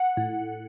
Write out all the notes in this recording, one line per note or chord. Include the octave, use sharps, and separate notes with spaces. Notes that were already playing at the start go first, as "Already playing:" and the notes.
Already playing: F#5
A2